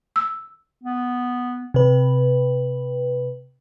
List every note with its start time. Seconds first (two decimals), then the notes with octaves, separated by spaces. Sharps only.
0.16 E6
0.84 B3
1.74 C3 B4